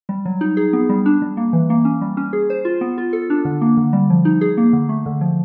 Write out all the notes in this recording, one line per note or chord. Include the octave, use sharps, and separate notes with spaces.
G3
F#3
D#4
G#4
B3
G3
D4
G3
A#3
E3
A#3
C#4
G3
C#4
G#4
C5
F4
B3
F4
A4
D4
D3
A#3
D3
G3
F3
D#4
G#4
A#3
D3
A3
D3
F3